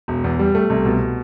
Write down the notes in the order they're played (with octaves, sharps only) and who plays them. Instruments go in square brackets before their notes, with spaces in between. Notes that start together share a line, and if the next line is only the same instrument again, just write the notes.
[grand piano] E1
E2
G3
A3
C2
B2